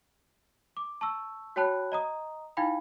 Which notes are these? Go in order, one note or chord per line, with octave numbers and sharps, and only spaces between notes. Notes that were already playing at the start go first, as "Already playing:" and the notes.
D6
A5 C#6 E6
F#4 C#5 G5 A5 B5 F#6
D#5 A#5 D#6
D#4 E4 F5 G5 B5